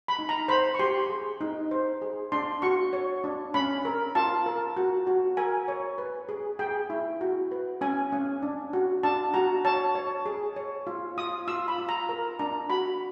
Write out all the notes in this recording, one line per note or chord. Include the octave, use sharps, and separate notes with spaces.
B5
D#4
A#5
C5 B5
C#6
G4 C6
G#4
D#4
C5
G#4
D4 C6
F#4 C#6
C#5
D4
C#4 B5
A#4
F4 A5
A#4
F#4
F#4
A#4 G#5
C#5
B4
G#4
G#4 G5
E4
F#4
B4
C#4 G#5
C#4
D4
F#4
D4 A5
F#4 A#5
C#5 A5
C#5
G#4
C#5
F4
F4 D#6
F4 E6
B5
F4
A#5
A#4
D4 A#5
F#4 B5